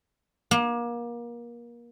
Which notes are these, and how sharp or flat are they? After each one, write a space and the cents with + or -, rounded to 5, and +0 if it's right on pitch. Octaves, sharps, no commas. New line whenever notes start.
A#3 +30